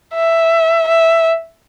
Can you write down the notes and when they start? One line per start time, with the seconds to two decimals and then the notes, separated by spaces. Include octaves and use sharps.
0.14 E5
0.88 E5